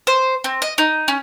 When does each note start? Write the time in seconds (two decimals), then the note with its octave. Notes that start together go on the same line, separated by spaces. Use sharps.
0.07 C5
0.44 C4
0.62 D#5
0.78 D#4
1.08 C#4